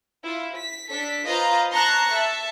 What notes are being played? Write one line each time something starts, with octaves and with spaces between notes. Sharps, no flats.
E4 F4
B6
D4 A4 B6
F4 B4 C5 D#5 F5 A#5
A5 A#5 C6 C#6 F#6 A#6
A4 E5 A5